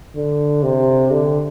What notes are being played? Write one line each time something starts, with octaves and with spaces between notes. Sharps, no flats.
D3
C3
D3